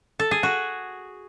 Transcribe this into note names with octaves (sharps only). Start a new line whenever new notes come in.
A4
G#4
F#4